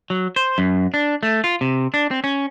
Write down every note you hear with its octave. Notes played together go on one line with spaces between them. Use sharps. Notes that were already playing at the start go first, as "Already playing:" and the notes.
F#3
C5
F#2
D4
A3
F4
C3
D4
C4
C#4